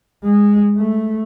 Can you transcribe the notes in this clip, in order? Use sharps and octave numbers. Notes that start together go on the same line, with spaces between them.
G#3
A3